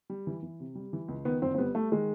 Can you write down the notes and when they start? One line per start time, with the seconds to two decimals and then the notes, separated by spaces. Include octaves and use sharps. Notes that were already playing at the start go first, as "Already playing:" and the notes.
0.10 G3
0.27 E3
0.43 E3
0.60 C3
0.75 G3
0.93 E3
1.08 C#2
1.25 D#3 B3
1.42 G1 C4
1.55 C4
1.58 G3 B3
1.75 G3 A3
1.92 D#3 G#3